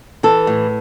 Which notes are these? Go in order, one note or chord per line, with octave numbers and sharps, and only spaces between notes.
E3 A4
A2